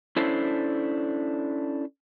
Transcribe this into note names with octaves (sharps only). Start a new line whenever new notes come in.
C#4 D4 E4 A4 C5